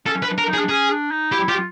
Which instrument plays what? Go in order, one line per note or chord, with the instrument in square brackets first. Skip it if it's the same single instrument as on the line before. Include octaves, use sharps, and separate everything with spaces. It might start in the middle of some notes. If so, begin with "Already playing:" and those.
[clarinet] C#4 [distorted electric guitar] A4
[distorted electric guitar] B4
[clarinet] D4
[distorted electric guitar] A#4
[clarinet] D#4
[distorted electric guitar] G#4
[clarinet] D4
[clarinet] C#4 [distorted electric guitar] G#4
[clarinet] D4
D#4
[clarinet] E4 [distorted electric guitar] G4
[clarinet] F4 [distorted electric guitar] G4